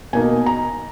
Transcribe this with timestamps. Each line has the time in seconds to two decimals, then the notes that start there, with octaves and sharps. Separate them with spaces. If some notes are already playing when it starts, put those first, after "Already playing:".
0.13 B2 A#3 D#4 G#5
0.46 A#5